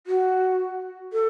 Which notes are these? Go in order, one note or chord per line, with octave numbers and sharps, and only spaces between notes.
F#4
A4